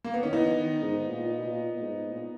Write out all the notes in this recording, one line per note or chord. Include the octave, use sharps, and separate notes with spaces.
A#3
B3
D#3 C#4
E3 B3 D#4
E3
D#3
G#2
A#2
A#2
B2
A#2
A#2
G#2
A#2